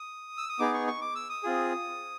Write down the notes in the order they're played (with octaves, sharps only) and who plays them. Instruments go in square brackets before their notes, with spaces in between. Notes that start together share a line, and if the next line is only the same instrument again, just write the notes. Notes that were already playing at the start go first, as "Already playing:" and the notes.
Already playing: [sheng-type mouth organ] D#6
E6
D#6
B3 D#4 G#4 D6
C#6
C#6
D6
E6
D#6
C4 F4 G#4